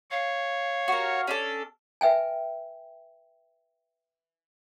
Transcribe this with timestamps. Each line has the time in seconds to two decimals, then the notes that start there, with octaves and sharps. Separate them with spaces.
0.11 C#5 F5
0.88 F#4 A#4
1.27 C#4 D4 A4
2.01 B4 E5 G5 G#5